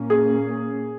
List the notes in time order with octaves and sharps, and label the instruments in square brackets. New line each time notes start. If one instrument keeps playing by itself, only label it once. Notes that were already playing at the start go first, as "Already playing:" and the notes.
Already playing: [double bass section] A#2 A#3 C#4
[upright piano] G#4